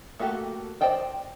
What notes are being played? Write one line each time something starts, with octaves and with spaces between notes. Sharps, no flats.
A3 A#3 F#4 G4 A4
C5 D5 D#5 G5 A5